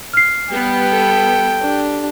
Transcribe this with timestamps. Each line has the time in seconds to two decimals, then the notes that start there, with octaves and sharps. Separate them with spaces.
0.13 F6 C7
0.50 G3 B3 G5
0.89 A4
1.61 D4 G4